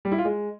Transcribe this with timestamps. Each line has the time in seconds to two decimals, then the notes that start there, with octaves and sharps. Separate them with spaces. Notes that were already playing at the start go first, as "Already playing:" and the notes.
0.05 G3
0.12 E4
0.18 F4
0.25 G#3